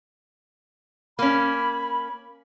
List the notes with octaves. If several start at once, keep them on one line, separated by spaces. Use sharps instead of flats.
A#3 C#4 B5